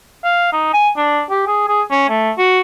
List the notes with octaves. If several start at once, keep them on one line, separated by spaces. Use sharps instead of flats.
F5
D#4
G#5
D4
G4
G#4
G#4
C#4
A3
F#4